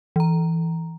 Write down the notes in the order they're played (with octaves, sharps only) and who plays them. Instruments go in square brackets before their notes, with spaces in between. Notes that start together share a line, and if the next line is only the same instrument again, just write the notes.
[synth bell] E3 A#5